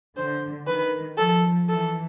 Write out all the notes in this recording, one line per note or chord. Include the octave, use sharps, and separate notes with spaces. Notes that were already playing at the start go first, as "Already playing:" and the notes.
D3 C5
D#3 B4
F3 A4
E3 A4